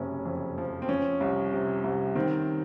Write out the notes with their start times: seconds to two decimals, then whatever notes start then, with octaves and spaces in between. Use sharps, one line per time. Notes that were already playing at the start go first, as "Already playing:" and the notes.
Already playing: F#1 C3 C#4
0.25 F2
0.58 F3
0.82 C4
0.89 F3 C#4
1.21 C2
1.53 C3
1.84 C2
2.15 D#3 C4